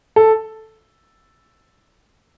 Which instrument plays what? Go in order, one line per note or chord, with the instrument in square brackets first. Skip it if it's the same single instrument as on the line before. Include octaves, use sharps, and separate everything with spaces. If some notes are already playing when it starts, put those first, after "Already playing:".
[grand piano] A4